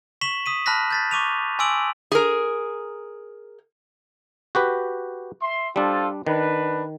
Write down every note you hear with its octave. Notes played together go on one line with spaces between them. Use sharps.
C#6 B6 E7 F#7
D#6 B6 D#7
A5 B5 F6 F#6 A#6 B6
G6 A6 B6
C#6 D6 D#7 F7
G#5 C6 D6 E6 D7 F#7
G#4 A#4
F#4 G4 B4
E5 C6
G3 D4 F4 A4 C5
D#3 D4 B4